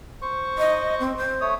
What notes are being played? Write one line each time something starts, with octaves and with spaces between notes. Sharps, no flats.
C5 C#6
D#5
C4
C5
A3 C#5 D#6